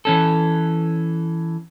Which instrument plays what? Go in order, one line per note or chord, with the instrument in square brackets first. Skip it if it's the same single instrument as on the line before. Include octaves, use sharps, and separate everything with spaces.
[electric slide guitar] E3 C#4 A4